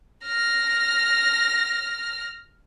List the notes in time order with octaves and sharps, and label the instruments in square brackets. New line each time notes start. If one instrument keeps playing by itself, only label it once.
[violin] F6 A#6